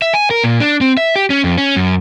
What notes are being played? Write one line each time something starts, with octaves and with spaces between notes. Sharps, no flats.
E5
G#5
A#4
A#2
D4
C4
E5
G4
C#4
F2
C#4
F#2